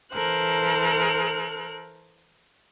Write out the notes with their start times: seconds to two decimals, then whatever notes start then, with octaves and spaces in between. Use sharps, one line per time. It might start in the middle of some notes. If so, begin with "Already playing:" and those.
0.12 E3 A4 A#4 C5 F6 F#6